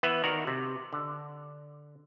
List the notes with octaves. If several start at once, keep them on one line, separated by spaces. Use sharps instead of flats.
E3 B3 B4 E5
D#3 F#4 A#4 D5
C3
D3